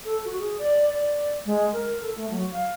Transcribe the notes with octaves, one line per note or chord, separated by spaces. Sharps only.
A4
F#4
G#4
D5
D5
G#3
A#4
A4
A3
F#3
F5